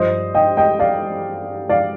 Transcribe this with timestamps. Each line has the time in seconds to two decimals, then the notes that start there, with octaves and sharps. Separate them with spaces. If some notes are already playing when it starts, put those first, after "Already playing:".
Already playing: G2 F3 C5 D#5
0.34 D#5 G5
0.57 D#5 G5
0.80 D5 F5
1.69 D5 F5